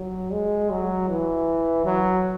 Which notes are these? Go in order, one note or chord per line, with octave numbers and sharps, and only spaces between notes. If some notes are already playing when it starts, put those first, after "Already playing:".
Already playing: F#3
G#3
F#3
E3
F#3